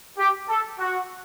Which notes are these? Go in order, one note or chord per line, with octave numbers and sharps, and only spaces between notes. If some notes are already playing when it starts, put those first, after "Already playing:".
G4
A4
F#4